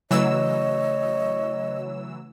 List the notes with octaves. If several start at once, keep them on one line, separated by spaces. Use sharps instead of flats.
C#3 E3 F#3 A3 C#5 D#5 E6